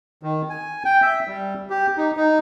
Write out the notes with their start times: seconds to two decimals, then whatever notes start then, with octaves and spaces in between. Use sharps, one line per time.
0.23 D#3
0.50 G#5
0.85 G5
1.02 E5
1.27 G3
1.70 G4
1.97 D#4
2.17 D#4